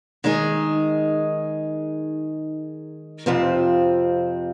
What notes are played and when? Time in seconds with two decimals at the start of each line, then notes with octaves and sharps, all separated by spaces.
0.24 D#3 G#3 D#4 G#4
3.26 F2 C3 F3 C4